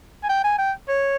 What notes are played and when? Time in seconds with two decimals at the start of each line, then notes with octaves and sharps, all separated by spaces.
0.23 G#5
0.29 G5
0.44 G#5
0.59 G5
0.89 C#5